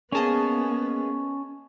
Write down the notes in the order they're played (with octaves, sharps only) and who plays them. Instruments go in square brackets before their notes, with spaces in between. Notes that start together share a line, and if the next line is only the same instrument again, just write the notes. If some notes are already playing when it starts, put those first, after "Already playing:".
[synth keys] A#3 G#4 D#5 [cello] B3 [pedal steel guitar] C#4 A5